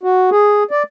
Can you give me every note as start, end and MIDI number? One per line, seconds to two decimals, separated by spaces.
0.03 0.30 66
0.31 0.63 68
0.71 0.83 74